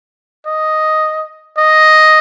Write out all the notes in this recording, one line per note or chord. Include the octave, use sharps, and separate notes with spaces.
D#5
D#5